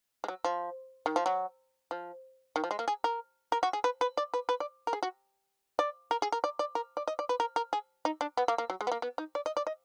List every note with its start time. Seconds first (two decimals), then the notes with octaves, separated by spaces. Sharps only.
0.24 G#3
0.28 F#3
0.45 F3
1.06 D#3
1.16 F3
1.26 F#3
1.91 F3
2.56 D#3
2.64 F3
2.71 G#3
2.79 A#3
2.88 G#4
3.04 A#4
3.52 A#4
3.63 F#4
3.73 G#4
3.84 B4
4.01 B4
4.17 D5
4.34 B4
4.49 B4
4.60 D5
4.87 A#4
4.93 G#4
5.03 F#4
5.79 D5
6.11 A#4
6.22 G#4
6.32 A#4
6.44 D5
6.59 D5
6.75 A#4
6.97 D5
7.08 D#5
7.19 D5
7.29 B4
7.40 A#4
7.56 A#4
7.73 G#4
8.05 D#4
8.21 D4
8.37 B3
8.48 A#3
8.58 A#3
8.70 F#3
8.81 G#3
8.87 B3
8.92 A#3
9.02 B3
9.18 D#4
9.35 D5
9.46 D#5
9.57 D5
9.67 D#5